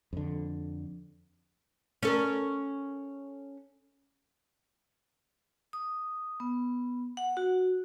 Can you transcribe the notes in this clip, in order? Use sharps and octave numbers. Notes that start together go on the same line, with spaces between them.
F2 D3
C#4 A4 A#4
D#6
B3
F#5
F#4